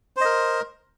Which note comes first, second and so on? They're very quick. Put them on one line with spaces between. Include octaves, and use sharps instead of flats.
C5 D#5 A#4